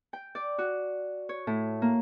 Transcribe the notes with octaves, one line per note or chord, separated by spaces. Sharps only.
G5
D5
F#4
C#5
A2
A#3